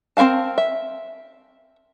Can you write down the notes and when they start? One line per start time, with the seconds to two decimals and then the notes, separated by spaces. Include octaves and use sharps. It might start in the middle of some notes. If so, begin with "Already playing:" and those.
0.17 C4 E4 A#4 F5 A5
0.58 E5